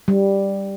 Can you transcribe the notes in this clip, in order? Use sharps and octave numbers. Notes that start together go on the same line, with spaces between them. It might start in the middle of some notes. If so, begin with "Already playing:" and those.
G3